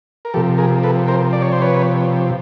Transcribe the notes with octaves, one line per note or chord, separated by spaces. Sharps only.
A#4
C3 F3 G4 A4
G#4 A#4
A4 B4
A#4 C5
D5
C#5
C5
B4 C#5